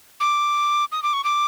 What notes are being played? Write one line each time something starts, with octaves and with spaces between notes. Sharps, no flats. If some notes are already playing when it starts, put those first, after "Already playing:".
D6
D#6
D6
C#6
D6